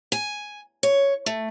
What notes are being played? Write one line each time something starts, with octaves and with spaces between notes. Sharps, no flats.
G#5
C#5
A3